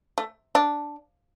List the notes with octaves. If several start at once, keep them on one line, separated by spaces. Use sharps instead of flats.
A3
D4